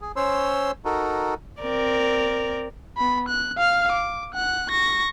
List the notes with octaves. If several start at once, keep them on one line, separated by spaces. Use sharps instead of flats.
G#4
C#4 C5 C#5 C6 E6
D#4 F#4 A4 A#4
C4 A#4 D5
B3 B5
F#6
F5 F6
D6
F#5 F#6
C#6 A#6